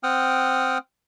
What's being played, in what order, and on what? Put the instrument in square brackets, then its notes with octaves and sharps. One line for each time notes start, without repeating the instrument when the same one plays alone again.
[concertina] C4 F#5 G5 D#6 F6